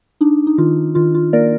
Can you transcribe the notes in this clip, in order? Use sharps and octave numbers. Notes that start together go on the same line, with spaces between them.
D4 D#4
D#4
D#3 F4
D#3 F4
F4
A#3 A#4 D5